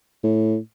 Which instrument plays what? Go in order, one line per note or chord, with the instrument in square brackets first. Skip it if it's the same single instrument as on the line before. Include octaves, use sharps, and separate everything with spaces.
[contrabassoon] A2